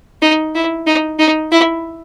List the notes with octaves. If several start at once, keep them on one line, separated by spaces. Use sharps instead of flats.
D#4
E4
D#4
D#4
E4